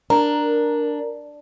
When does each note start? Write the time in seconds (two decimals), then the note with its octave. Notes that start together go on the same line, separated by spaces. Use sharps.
0.10 D4 A#4